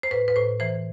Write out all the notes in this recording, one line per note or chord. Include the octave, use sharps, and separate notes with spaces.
C5
A2 B4
B4
A2 C5
E3 C5